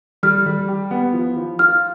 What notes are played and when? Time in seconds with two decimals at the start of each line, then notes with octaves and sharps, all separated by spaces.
0.23 G3 F6
0.46 G3
0.68 G4
0.91 B3
1.13 F3
1.37 F3
1.59 F4 F6